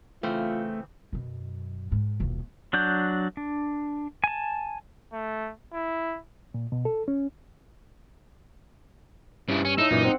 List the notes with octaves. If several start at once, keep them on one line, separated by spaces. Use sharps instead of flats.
C#3 E3 A3 C4 F4
F#2 B2
G#2
D#1 B1
F#3 D4 F#5 G6
D4
G#5 A5
A3
E4
A#2
B2
A4
C#4
G2 C#3 E4
C#4
A2 D#4 E6
F#2 A#2 E3
C4 F#5